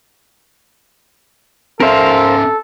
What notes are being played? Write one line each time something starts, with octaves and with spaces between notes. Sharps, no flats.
C#4 A4 A#4 C5 E5 F5